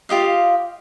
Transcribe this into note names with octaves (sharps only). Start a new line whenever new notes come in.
F4 G4 D#5 F5